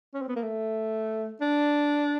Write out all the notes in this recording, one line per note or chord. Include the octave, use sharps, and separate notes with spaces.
C#4
C4
B3
A#3
A3
D4